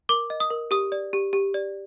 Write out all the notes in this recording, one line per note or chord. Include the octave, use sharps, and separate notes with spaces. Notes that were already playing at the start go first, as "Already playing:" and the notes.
A#4 D6
D#5
D#6
A#4
G4 D#6
D5
G4
G4
D5